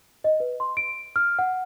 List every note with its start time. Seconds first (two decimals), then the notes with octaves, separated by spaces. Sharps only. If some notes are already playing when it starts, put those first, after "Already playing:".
0.24 D#5
0.40 B4
0.60 C6
0.77 D7
1.16 F6
1.39 F#5